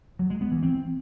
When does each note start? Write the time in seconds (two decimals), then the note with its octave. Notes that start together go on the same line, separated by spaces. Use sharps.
0.19 F#3
0.30 G#3
0.41 B3
0.52 E3
0.62 C4